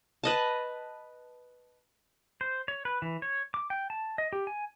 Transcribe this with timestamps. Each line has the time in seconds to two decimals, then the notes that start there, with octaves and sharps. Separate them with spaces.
0.23 B4 D#5 A5
2.41 C5
2.68 C#5
2.85 B4
3.02 E3
3.22 C#5
3.54 D6
3.70 G5
3.90 A5
4.18 D#5
4.33 G4
4.47 G#5